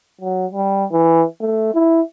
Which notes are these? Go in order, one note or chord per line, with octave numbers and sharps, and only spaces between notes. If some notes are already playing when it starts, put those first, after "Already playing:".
F#3
G3
E3
A3
E4